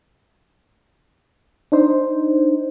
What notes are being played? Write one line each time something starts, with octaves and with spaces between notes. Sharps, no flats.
D4 D#4 C5